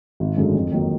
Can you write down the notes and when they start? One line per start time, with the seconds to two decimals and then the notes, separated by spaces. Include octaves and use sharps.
0.20 G#1
0.37 F#2 D3 G#3
0.54 F2
0.72 D#3 F#3 A#3